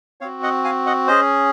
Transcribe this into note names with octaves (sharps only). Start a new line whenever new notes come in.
C4 F#4 C#5 F5
D#5 F#5
F5 G#5
D#5 F#5
C#4 G#4 C5 D#5